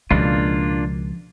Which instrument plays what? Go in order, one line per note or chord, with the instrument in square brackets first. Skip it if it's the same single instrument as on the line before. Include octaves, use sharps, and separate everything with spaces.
[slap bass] C#2 B2 [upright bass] F3 [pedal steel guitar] A#3 D4 F4